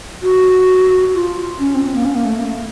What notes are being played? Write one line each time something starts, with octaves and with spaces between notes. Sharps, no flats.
F#4
F4
C#4
C4
C4
A#3
C#4
A#3
A3
A#3
A3
A#3